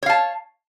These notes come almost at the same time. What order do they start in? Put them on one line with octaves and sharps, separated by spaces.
C#5 F5 A5